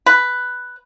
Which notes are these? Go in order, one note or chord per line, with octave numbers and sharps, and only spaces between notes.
B4